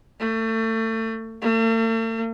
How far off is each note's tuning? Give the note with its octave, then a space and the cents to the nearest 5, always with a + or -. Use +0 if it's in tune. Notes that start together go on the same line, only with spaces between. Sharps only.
A3 +30
A3 +45